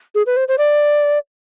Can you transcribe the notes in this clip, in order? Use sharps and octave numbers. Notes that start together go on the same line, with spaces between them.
G#4
B4
C5
C5
D5